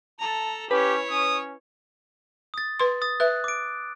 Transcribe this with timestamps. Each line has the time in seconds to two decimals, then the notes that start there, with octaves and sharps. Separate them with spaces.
0.19 A4 A5 A#5
0.71 C#4 E4 G4 B4 C#5
1.10 C#4 D#6
2.54 D#6 A6
2.79 B4 C6
3.02 D#6 A6
3.20 B4 E5 F#6
3.44 D6 D7